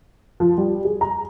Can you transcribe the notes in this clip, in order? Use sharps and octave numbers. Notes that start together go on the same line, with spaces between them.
F3
G3
G#4
A#5